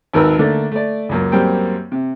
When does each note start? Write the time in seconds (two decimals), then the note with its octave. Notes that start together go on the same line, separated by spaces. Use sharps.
0.13 G#1 D#2 A#4 B4 E6
0.39 D3 A3 A#3 D4
0.71 A3 D5
1.09 C#2 F#2 A#3
1.32 F#2 G3 A#3 C4 G5
1.92 C3